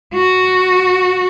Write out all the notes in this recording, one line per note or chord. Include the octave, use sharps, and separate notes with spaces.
F#4